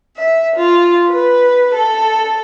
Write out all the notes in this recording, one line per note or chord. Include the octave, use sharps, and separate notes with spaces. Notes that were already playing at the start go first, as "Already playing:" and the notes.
E5
F4
B4
A4